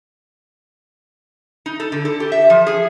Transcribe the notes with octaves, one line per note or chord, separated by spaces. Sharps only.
D#4
A4
D3
A4
G4
E5
F3
G#4